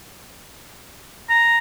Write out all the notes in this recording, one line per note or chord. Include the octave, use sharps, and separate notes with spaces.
A#5